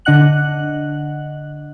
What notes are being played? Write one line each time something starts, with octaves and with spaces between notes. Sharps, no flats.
D3 D4 D#5 F#5 F#6 F#7